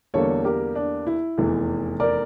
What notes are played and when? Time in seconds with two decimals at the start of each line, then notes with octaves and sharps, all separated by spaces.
0.14 E2 D3 G3 A#3 A4 C#5
0.44 G4 A#4
0.75 D4
1.07 E4
1.38 F1 E2 E3
2.00 A#4 D5